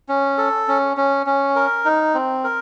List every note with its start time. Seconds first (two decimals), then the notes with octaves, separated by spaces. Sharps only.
0.09 C#4
0.38 A4
0.68 C#4
0.97 C#4
1.26 C#4
1.56 A#4
1.85 D#4
2.14 C4
2.44 A#4